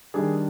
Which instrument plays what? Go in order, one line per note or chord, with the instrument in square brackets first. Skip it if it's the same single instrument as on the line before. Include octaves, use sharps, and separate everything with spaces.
[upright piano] D#3 G3 D4 G#4